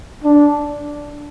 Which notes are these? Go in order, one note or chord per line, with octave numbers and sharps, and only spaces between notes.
D4